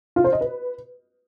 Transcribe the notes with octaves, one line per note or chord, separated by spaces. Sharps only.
F4
C5
D#5
B4